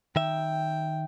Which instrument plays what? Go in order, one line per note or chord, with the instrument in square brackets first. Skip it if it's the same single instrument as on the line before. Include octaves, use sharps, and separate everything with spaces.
[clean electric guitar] D#3 E5 [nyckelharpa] G5